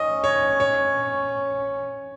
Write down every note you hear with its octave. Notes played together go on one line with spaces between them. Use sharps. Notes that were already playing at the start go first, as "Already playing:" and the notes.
Already playing: C#4 D#5
C#5
C#5